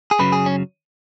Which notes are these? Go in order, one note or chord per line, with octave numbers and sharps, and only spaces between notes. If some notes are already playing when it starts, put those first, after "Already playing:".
G#4
F#2 C#3 F#3 B4
G#4
C#4